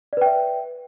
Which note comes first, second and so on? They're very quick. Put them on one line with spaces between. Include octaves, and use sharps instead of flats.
D5 B4 G5 E5